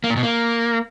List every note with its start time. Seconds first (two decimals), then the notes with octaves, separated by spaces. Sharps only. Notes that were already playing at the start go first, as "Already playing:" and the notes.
0.04 A#3
0.10 A#2
0.17 B2
0.23 A#3